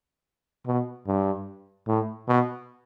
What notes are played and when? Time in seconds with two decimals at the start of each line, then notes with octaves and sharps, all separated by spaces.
0.67 B2
1.07 G2
1.88 A2
2.28 B2